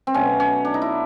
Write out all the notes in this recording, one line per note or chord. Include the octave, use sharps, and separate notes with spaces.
C4
B2 F#3 A3 C#4
C#4
D4
D#4
E4